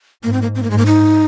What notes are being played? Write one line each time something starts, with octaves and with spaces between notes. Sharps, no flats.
G#2 A#3
C4
A#3
C4
A#3
G#2 G#3
A#3
D#4